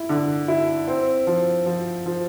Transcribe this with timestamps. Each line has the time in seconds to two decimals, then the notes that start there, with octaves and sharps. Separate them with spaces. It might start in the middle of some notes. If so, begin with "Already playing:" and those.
Already playing: E4
0.09 D3
0.48 E4
0.88 C4
1.27 F3
1.66 F3
2.06 F3